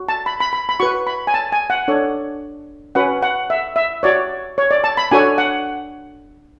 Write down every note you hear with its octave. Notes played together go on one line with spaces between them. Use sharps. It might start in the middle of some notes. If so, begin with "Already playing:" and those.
Already playing: F#4
A5
B5
B5
B5
B5
F#4 B4 C#6
B5
G#5
A5
G#5
F#5
D4 A4 C#5
C#4 F#4 B4 F#5
F#5
E5
E5
F#4 C#5 D5
C#5
D5
A5
B5
D4 F#4 A4 C#5 G#5
F#5